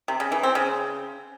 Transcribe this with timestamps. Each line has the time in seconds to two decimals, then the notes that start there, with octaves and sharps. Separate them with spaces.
0.08 C3
0.20 C#3
0.32 E3
0.43 C4
0.55 C#3